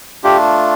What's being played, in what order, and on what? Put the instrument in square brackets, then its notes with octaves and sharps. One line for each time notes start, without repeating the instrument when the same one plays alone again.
[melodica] A3 D4 F4 [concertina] G4